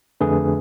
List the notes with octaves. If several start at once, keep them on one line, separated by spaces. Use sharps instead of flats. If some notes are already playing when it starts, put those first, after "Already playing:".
F2 D3 A3 D4 G#4 B4